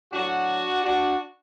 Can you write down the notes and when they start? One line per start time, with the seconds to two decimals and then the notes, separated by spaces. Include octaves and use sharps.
0.13 A2 F#3 D4 F#4
0.84 D4 F#4